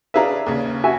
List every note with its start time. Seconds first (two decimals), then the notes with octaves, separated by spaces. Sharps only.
0.14 D4 G#4 B4 E5 F5 A#5
0.46 D#2 C#3
0.84 F#4 E5 G#5